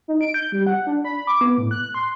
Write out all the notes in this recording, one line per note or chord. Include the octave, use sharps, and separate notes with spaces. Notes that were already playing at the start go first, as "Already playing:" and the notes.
D#4
D7
G6
G3
F#5
D4
B5
D6
B3
A2
F#6
C6